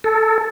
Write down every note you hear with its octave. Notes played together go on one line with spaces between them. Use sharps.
A4